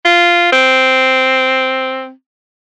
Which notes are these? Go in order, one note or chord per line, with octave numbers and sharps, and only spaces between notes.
F4
C4